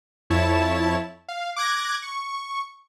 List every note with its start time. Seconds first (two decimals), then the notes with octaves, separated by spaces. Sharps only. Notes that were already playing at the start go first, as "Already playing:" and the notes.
0.30 F2 E4 C#5 A5 E7
1.29 F5
1.56 D6 F#6 G#6 A#6
2.02 C#6